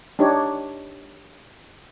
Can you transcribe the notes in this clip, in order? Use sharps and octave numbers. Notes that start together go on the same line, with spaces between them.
D4 D#4 G4 C#5